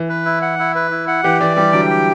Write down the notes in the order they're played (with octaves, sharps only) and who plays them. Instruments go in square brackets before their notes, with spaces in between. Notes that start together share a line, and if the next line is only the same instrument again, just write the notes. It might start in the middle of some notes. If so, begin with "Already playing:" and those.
Already playing: [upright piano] E3
[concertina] B4
E4
F#5
E4
B4
E4
F#5
[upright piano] E3 [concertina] G4
[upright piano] E3 [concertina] D5
[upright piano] E3 G3 [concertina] G4
[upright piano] D3 F#3 [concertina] G5
[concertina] G4